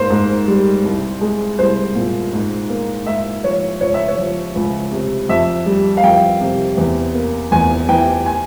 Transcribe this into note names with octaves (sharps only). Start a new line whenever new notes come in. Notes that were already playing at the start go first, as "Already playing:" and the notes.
Already playing: G#2 A#3 C5
G#2
G3
C2
G#3
C2 C5
A#2
G#2
A#3
G#2 E5
F3 C#5
C#2 C#5
E5
C#5
F3
C#2
C3
F2 E5
G3
F5
F2 G5
C3
E2
A#3
E2 G#5
E3 G5
G#5